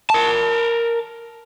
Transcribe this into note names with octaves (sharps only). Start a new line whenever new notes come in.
A#4 A5